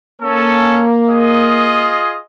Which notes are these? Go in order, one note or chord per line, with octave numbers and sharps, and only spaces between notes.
A#3 C#4 A4
F4 G#4 D#5